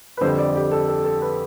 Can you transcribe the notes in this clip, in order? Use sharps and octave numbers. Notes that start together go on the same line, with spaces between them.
B4
F2 D3 G3 C5
D5
G4
A4
A4
A4
B4